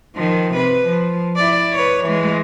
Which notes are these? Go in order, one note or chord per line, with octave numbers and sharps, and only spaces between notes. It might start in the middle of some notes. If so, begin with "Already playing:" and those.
D#3 F3
C3 B4
F3
E4 D5
B4 C#5
E3 G#3